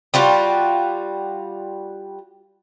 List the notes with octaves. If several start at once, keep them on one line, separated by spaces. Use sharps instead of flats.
G3 F4 F#4